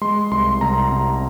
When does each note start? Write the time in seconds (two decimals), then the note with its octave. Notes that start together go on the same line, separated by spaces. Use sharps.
0.01 G#3 C6
0.31 C2 C6
0.61 C2 A#5
0.92 C3